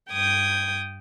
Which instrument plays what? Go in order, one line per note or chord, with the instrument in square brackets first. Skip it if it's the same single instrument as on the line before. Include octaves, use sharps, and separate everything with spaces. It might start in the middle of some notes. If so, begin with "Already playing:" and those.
[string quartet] G2 G5 D#6 G#6